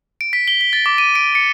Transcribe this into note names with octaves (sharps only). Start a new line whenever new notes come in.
D7
B6
G7
B6
A6
D6
D#7
D7
C#7